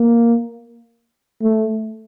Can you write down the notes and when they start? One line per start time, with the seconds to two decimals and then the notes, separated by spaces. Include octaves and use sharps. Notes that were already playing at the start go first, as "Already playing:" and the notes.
Already playing: A#3
1.42 A3